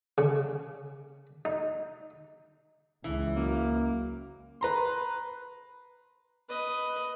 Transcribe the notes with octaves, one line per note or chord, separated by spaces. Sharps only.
C#3
D#4
C#2 E3
F#2 A#3
B4 A#5 C6
B4 D#5